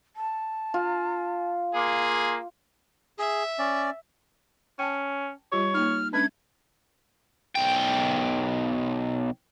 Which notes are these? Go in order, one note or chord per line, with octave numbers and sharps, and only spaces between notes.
A5
F4
A#3 G#4 C6
G#4 E5
C#4 D5
C#4 G5 A5
G3 F4 G4 C#5
A#3 D#4 F6
G#3 C#4 D4 B4 G#6
B1 G5